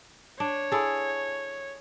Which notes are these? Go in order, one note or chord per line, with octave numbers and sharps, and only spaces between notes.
D4 C#5
E4 G#4 A4